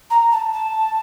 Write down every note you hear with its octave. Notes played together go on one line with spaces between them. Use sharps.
A#5
A5
A5